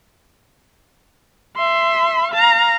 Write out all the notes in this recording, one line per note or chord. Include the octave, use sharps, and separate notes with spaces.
E5 C6
F5 A#5